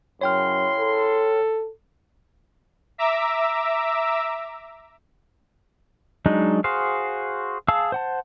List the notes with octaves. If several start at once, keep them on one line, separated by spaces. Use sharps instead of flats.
F#2 C#3 E4 C#5 G5 C6 F6
A4
E5 A#5 D6 E6
F#3 G#3 D4 D#4
F#4 G#4 C5 F5
G#4 F5 A5 E6
C5 F#5 A5